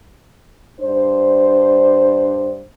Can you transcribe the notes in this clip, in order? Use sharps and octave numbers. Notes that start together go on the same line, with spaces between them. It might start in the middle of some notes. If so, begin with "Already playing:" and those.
G2 D4 C5